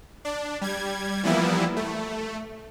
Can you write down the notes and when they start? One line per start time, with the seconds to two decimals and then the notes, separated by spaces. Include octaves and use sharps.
0.25 D4
0.61 G3 G#6
1.23 E3 F3 G3 A#3 B3 E4
1.76 A3